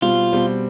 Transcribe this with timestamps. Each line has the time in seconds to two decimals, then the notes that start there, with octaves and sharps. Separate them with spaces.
0.02 B2 G3 C4 F4
0.32 B2 G3 C4